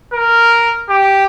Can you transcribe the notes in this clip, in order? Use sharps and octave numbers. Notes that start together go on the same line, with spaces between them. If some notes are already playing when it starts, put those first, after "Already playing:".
A#4
G4